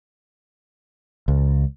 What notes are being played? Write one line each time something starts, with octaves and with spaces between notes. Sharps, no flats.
C#2